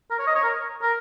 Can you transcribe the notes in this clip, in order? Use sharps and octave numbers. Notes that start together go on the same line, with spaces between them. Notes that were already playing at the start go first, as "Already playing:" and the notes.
A#4
C#5
D#5
C#5
A#4
A#4